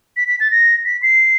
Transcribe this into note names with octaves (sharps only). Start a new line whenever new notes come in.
B6
B6
A6
A#6
B6
C7